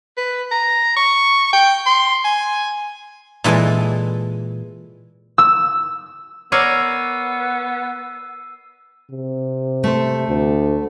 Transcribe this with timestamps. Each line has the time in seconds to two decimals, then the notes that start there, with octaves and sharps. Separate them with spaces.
0.17 B4
0.51 A#5
0.97 C#6
1.53 G5
1.86 C6
2.24 G#5
3.44 A#2 E3 G#3 A4 G#5
5.38 E6
6.52 B3 A#4 C#5 D5 E6 C7 D#7
9.11 C3
9.84 A3 C5
10.28 D2